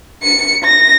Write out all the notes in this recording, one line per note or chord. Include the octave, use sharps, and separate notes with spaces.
C#7
A#6